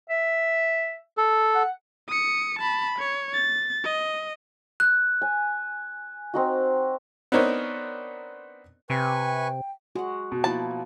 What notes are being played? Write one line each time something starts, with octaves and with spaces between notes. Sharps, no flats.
E5
A4
F#5
D#6 C#7
A5 B5
C#5
A6
D#5
F#6
G#5
C4 D#4 F#4
B3 C4 D4 D#4 A#4 C#5
C3 B4 G5 G#5 C#6
G#3 F#4 F#5
B2
F3 A#3 E4 A5